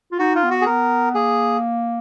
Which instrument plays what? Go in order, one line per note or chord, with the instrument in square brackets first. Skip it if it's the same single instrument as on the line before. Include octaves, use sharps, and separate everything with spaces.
[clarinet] F4
[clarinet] D#4 [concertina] F#4
[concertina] F4
[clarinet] B3
[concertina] F#4
G#4
[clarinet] B3 [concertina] A#4
[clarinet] A#3 [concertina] G#4